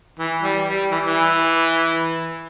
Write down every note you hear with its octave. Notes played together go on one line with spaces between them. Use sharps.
E3
G3
G3
E3
E3